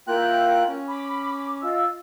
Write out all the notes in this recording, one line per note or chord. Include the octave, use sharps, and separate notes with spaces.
A#3 E4 F4 A#4 G5 F#6
C#4
B5 D6
F4 D#5 E6